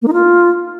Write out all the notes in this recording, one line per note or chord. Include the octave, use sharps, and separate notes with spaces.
A#3
D#4
F4